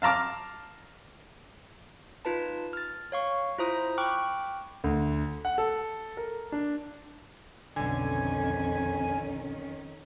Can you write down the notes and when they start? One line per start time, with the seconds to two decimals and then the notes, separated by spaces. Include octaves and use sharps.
0.02 F5 A5 A#5 D6 F6
2.25 D#4 F4 B4 A5
2.73 F6 A6
3.12 C#5 F5 C#6
3.58 E4 F4 C5 A#5 D#6
3.98 G5 B5 C#6 D6 F6 F#6
4.84 D2
5.45 F#5
5.58 A4
6.17 A#4
6.52 D4
7.76 B1 F2 D3 D#3 C#4 G#5